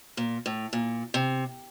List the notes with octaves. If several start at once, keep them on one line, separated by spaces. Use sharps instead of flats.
A#2
A2
A#2
C3